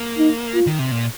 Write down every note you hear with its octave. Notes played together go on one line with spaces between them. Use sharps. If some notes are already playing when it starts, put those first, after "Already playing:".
Already playing: A#3
D#4
F4
D#3
C3
A#2